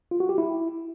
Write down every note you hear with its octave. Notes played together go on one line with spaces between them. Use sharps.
F4
F#4
G4
E4